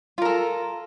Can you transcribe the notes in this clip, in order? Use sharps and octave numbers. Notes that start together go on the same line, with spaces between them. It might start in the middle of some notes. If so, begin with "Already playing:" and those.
F4 A4 A#4